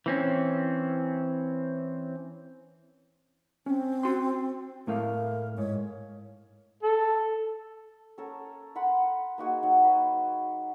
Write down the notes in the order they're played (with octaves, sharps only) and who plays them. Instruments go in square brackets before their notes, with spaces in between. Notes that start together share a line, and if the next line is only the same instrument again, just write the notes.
[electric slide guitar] E3 C4 C#4
[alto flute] C4 [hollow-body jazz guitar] C#4
[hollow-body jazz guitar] F#4 C6
[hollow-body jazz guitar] A2 A3 F5 [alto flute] A#4
[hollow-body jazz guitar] G#2 [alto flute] C#5
[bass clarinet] A4
[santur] C#4 A4 A#4
A#4 F#5 B5 C6
A#3 D#4 F#4 G#4
F#3 D#4 F#5
F#3 B4